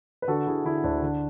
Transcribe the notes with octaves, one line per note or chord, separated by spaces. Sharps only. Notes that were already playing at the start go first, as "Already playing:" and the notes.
B4
D3 F#4 A4
D3 E4 G#4
D3 E4
D2 D4
D3